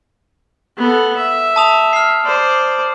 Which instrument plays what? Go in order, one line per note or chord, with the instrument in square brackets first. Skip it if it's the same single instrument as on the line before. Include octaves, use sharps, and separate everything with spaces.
[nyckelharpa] B3 A4
E5
[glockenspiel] A5 D#6 F7
F6 C7
[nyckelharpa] C5 D5